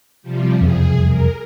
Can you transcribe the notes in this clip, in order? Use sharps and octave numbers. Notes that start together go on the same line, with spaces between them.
C3 F3 G3
E1 C2 F2 G#4
A#4